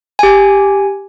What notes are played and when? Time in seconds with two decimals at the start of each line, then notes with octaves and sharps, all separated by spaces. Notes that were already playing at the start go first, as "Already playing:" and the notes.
0.19 G4 G#5